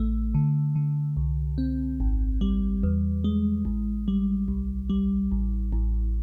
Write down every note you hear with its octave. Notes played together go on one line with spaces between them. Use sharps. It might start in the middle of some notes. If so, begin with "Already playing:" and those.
Already playing: A1 A3
D3
D3
C2
C4
G#1
G3
E2
G#3
A1
G3
C2
G3
A1
A1